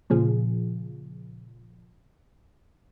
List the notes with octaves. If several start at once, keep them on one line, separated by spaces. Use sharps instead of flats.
A#2 C#3 F3 G#4